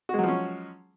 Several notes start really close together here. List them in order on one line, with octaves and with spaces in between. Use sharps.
F#4 G#3 F#3 F3 C#4